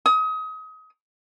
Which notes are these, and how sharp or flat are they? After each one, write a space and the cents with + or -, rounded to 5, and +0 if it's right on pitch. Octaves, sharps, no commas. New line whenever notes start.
D#6 +30